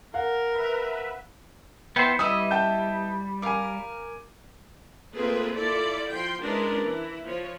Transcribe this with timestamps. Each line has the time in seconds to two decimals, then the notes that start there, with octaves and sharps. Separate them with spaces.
0.14 A#4 F5 F#5
0.53 B4 E5
1.96 B3 E4 C5 G5
2.19 G3 B3 E4 D#5 D#6
2.51 G5 A5 G6
3.42 A#4 F5 G#5 D6
5.15 A3 A#3 C4 F4 G#4 B4
5.56 E4 F4 A4 D5
6.11 F3 G5 C6
6.42 G#3 C#4 D4 E4 A#4 B4
6.84 E3 E4
7.24 F3 C#5